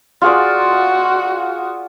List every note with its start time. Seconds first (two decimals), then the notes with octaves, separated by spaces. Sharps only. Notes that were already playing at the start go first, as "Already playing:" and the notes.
0.22 F4 F#4 G#4 D5